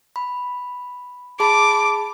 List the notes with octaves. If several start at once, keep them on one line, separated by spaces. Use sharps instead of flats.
B5
G#4 A5 B5 D6